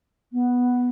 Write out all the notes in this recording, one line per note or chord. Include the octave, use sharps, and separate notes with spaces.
B3